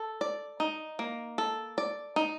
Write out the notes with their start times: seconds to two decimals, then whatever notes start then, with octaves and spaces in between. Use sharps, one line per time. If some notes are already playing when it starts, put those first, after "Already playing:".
Already playing: A4
0.21 D5
0.60 D#4
0.99 A#3
1.38 A4
1.78 D5
2.16 D#4